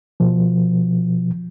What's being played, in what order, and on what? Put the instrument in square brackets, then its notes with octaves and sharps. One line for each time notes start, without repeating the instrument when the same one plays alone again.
[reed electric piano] B2 F3